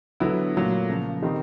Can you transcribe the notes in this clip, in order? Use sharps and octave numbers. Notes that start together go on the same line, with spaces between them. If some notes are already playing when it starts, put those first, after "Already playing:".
D3 F#3 B3 E4
A#2 F#3 A3
C#3 F3 A#3
D#3 G3 C4 D#4